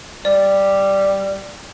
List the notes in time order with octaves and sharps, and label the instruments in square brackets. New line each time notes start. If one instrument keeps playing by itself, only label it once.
[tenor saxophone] G3 [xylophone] D5